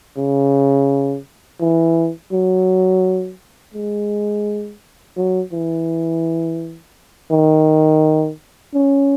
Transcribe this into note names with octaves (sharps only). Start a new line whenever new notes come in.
C#3
E3
F#3
G#3
F#3
E3
D#3
C#4